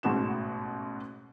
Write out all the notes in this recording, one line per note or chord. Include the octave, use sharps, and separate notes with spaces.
A1 G#2 B2 F#4 E7